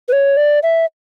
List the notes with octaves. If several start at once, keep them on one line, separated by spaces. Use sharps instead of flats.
B4
C#5
D5
E5